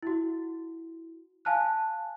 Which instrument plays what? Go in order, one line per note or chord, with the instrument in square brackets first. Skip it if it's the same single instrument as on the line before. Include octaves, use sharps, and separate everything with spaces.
[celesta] E4 F#4
F5 G#5 A5 F6 F#6